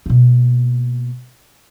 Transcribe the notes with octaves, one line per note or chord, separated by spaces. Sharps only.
B2 A#3